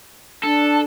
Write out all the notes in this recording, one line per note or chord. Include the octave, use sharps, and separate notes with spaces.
D4 A4